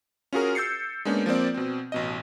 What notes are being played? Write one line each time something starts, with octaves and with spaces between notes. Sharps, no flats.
C#4 F4 F#4 G#4 A#4
E6 G6 A6 C7 C#7
G#3 A#3 B3 C#4 D4
F3 A#3 C4 D5
B2 C4
A1 B2 D#5